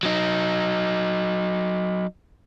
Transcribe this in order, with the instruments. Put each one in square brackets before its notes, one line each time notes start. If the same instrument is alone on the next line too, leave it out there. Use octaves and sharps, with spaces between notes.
[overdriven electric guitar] F#3 D#4